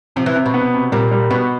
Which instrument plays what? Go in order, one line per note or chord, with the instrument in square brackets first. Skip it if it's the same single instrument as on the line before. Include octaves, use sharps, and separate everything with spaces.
[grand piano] C3 [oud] F3
[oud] E3
[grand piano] C3
[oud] B2
[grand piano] B3
C3
[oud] A#2 [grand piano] G3
[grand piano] G3
[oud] B2 [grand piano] B3